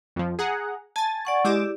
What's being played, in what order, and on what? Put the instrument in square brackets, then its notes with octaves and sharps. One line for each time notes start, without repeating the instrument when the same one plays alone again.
[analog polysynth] F2 F3
G#4 F#5 A#5
[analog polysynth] G#5 A6 [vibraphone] A5
[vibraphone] D5 F#5 C#6
[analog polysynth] G#3 D6 E7 [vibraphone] E4 G4 D5